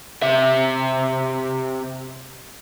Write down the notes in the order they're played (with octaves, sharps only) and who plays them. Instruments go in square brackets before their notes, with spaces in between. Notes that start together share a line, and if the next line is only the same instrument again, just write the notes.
[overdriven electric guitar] C3 E5